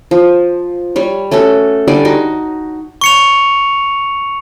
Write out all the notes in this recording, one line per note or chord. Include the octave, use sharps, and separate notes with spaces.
F3
G3 C#5
A3 C#4 F#4 A4
D3 G3 D5 G#5
D#4 F#4
C#6 C#7 F7